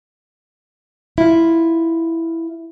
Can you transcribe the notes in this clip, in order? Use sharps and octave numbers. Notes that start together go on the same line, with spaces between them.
E4 F4